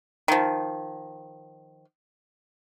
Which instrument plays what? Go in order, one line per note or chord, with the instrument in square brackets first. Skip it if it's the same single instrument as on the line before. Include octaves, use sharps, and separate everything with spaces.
[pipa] D#3 F3